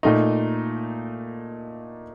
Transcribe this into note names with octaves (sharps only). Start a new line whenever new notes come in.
A#2 A3 D#4